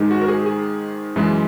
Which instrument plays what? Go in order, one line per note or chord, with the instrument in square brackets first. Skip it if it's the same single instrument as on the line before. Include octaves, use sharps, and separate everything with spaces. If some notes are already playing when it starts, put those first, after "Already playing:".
Already playing: [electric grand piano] G#2 D#3 G#3
F#4
A#4
G#4
G#4
F#2 E3 G#3